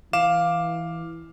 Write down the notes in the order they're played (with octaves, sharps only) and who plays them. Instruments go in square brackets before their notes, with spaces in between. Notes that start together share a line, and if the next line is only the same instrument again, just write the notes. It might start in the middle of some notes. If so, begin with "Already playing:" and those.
[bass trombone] E3 [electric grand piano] F5 D6 E7